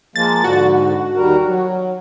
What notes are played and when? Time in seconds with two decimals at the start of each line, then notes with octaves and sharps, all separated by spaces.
0.16 F3 G#3 A#3 A6
0.44 G#2 D3 F#4
1.17 D#2 G3 A#4
1.47 F#3